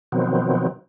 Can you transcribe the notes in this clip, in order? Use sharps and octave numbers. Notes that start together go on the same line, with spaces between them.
B2 D#3 F3 F#3 B3 C4